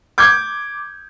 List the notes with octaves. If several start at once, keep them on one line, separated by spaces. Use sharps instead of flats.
D6 G6 G#6 D7